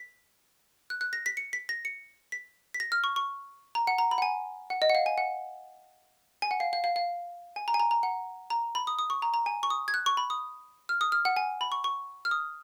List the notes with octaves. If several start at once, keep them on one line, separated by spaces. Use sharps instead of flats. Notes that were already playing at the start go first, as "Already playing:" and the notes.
Already playing: B6
F#6
F#6
A#6
B6
C#7
B6
A#6
C#7
B6
B6
A#6
F6
C#6
C#6
A#5
F#5
A#5
B5
F#5
G#5
F#5
D#5
F#5
F5
G#5
F#5
G#5
F#5
F5
F5
F5
F5
G#5
A#5
G#5
A#5
A#5
F#5
A#5
B5
D#6
D#6
C#6
A#5
A#5
G#5
C#6
D#6
G#6
F#6
C#6
B5
D#6
F6
D#6
F6
F#5
G#5
B5
C#6
C#6
F6
D#6